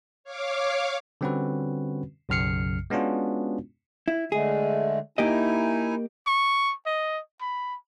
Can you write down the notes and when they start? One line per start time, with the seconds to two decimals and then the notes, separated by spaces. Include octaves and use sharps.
0.24 C#5 F5 D6
1.21 D3 G3 C4 C#4 F#4 B4
2.29 B1 F#2 C#3 F6 C7 C#7
2.90 G#3 B3 C#4 D4 F4 F#4
4.08 E4
4.32 D3 G#3 A3 G#4
5.18 A#3 D#4 E4 G4 D#5 G#5
6.27 C#6
6.86 D#5
7.41 B5